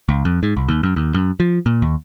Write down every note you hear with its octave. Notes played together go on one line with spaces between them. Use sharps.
C#2
F2
G#2
C2
D#2
F#2
D#2
F#2
F3
A#2
D#2